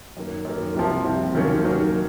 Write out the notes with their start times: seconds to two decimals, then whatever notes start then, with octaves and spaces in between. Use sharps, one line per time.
0.17 F#2 D#3 A#3
0.45 F#2 D#3 A#3
0.75 C2 C3 F3
1.04 C2 C3 F3
1.35 D#2 D#3 F#3 A#3 C#4
1.64 D#2 D#3 F#3 A#3 C#4